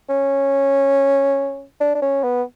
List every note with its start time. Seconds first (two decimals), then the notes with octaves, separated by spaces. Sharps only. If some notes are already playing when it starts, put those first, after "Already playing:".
0.10 C#4
1.81 D4
1.95 D4
2.02 C#4
2.23 B3